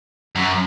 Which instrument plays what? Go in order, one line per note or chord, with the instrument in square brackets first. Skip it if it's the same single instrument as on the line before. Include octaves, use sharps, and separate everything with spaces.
[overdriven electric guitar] F#2